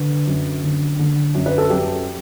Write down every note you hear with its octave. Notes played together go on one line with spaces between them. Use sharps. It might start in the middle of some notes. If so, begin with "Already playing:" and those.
Already playing: D3 B4
F#2
D3
D3
F#2
B4
A4
F#2 G4